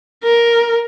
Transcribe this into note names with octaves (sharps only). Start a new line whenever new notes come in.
A#4